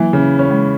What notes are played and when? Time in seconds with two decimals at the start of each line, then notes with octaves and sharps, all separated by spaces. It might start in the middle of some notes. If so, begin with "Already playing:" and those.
Already playing: E3 F#3 A#3
0.13 C#3
0.39 C#4
0.51 G#3